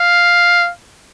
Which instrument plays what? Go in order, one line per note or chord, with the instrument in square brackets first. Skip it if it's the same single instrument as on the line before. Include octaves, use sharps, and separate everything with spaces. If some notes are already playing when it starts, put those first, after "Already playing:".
Already playing: [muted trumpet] F5